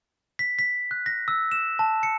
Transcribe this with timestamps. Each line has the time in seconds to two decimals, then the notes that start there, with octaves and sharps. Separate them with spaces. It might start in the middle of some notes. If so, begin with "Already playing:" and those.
0.39 B6
0.59 B6
0.91 F#6
1.06 A#6
1.28 E6
1.52 E7
1.79 A5
2.03 C#7